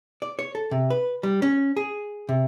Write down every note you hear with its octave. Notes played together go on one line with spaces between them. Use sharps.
D5
C#5
A4
C3
B4
G3
C#4
G#4
C3